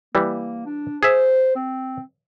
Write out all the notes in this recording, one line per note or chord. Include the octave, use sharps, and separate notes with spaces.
E3 G3 A#3
D4
G#4 C5 E5
C4